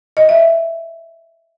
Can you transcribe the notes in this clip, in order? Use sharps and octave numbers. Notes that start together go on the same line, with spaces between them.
D#5
E5